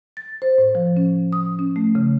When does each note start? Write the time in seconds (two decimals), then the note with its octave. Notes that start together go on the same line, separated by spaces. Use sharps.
0.17 A6
0.42 C5
0.58 A2
0.75 F3
0.97 C#4
1.33 D#6
1.59 C#4
1.76 A3
1.95 C#3